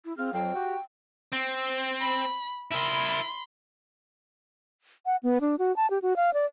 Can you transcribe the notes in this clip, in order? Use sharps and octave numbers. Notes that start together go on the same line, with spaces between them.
E4
C4 F4 G#4 F6
F2 F#3 F5 G5
F#4 G4
C4
B5
E4 A#4 B5 C6
F#5
B3
D4
F#4
A5
G4
F#4
F5
D5